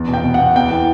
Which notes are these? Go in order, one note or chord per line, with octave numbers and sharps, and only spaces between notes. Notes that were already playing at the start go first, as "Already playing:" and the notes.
Already playing: E2
B2
G5
B2
F#5
B2
E2 G5
E3